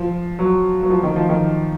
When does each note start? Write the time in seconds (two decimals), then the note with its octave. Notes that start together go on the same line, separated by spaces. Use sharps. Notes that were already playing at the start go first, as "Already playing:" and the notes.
Already playing: F3
0.39 F#3
0.83 F#3
0.90 F3
1.03 D#3
1.16 F3
1.29 D#3